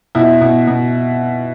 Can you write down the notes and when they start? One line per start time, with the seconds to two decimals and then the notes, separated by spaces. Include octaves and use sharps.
0.15 B2 E4
0.41 B2
0.67 B2